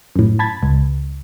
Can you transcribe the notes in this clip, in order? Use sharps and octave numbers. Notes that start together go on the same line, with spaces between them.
F#2 A2
A5 B5 G#6 A6
C#2